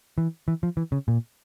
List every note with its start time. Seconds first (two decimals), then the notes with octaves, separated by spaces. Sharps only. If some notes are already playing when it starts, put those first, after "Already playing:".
0.18 E3
0.48 E3
0.63 F3
0.77 E3
0.92 C#3
1.08 A#2